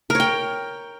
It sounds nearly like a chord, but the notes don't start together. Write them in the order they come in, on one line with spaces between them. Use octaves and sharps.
A#4 C#5 G5